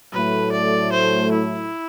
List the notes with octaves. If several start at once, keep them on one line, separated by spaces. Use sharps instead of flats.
A2 F#3 A3 B4
D5
C5
E4